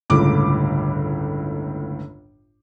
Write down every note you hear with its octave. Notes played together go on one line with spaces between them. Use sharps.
G1 C#2 A2 D6